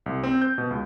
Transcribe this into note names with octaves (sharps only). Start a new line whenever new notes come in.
C2
C4
G6
B2
C#2